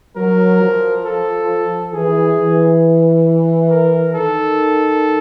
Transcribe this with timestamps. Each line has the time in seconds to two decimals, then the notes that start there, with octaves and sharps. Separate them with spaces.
0.15 F#3 A#4
0.61 F3
1.05 A4
1.93 E3 G#4
2.37 E3
3.70 A#4
4.14 D#3 A4